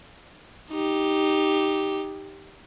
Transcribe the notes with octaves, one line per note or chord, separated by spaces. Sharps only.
D#4 G4